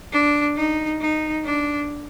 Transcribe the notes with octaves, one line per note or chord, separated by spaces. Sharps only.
D4
D#4
D#4
D4